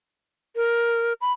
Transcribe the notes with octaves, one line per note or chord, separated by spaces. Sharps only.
A#4
B5